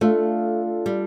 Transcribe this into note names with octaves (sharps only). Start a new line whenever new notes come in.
A3 D4 F4 A4 D5
G3